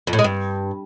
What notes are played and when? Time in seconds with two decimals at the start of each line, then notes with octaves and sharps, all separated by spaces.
0.07 F2
0.13 A2
0.19 G#3
0.24 G2